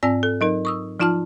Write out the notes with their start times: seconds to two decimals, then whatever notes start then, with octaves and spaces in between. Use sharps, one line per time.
0.03 G#2 C4 D5 G#5 E6 A#6
0.23 A4
0.41 F#3 D#4 A#4
0.65 C#6 D#6 E6
1.00 F3 D#4 F4 A5 F6